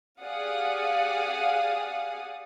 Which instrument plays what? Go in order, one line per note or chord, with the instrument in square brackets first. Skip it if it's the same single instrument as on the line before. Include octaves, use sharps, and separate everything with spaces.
[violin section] G4 G#4 D5 F5 F#5 D#6